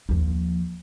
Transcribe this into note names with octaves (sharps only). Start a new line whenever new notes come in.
D#2 F3